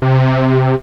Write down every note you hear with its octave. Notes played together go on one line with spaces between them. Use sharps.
C3